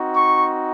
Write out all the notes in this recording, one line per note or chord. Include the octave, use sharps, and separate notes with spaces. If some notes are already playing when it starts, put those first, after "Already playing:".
Already playing: C4 D#4 F#4
C#6